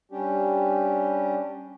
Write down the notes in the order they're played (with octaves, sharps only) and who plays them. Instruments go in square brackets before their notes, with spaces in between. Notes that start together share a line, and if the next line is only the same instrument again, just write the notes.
[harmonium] G3 C#4 D4 G4